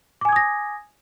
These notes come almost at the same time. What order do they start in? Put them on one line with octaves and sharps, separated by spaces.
D6 G#5 G#6 D#6 A#6